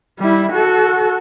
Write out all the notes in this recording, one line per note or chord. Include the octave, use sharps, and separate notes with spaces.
G3 E4
F#4 A4